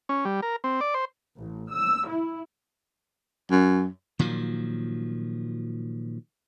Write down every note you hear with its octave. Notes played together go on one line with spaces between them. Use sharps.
C#4
G3
A#4
C4
D5
C5
A1
E6
E4
F#2
A#2 D#3 F3 F#3